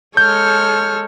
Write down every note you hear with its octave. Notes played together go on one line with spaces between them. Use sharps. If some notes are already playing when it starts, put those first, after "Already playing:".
G#3 A4 C#5 F6 G6